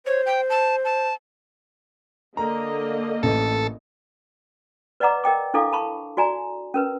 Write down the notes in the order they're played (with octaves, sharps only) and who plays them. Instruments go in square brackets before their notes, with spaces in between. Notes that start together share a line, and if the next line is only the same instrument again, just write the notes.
[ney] C5 [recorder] C#5
[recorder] G5
A5
A5
[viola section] D3 A#3 D#5 [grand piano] A#5
[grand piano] A1 [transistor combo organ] A4
[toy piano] B4 D5 D#5 F#5 A#5 D6
A#4 D#5 G5 D6
D4 E4 A4 F5 D6
A5 B5 C#6
F#4 D5 G#5 A#5
C#4 A#4 B4